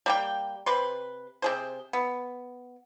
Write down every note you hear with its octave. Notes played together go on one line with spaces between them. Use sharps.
G3 A#3 G5
C3 B4 C6
C3 G#4 C5
B3